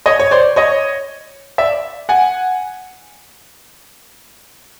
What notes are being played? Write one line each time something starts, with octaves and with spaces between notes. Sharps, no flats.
C#5 D#5
C#5
C5 D5
C#5 D#5
D5 E5
F#5 G#5